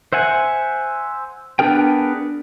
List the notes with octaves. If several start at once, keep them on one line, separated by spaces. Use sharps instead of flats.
C5 E5 F#5 G#5
B3 D4 G#4 A#4 G5